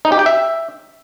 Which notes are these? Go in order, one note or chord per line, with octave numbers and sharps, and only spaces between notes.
D#4
G4
G5
E5